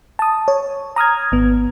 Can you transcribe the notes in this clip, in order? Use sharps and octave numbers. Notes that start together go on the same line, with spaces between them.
A5 D#6
C#5
A#5 D#6 F6 G#6
G#1 B3